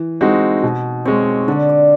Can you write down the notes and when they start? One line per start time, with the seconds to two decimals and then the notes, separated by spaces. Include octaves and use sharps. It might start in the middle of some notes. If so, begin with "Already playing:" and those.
Already playing: E3
0.21 G#3 C4 D#4 F#4
0.63 B2
1.05 G#3 C4 C#5
1.48 D3 D5
1.69 D5